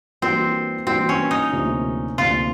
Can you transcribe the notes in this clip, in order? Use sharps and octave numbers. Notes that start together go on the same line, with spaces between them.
E3 G3 A#3 C4 D4 F#4
E3 G3 A#3 C4 D4 F#4
C#4
D#4
D2 C3 F3 A#3 D4
D2 C3 F3 A#3 D4 F4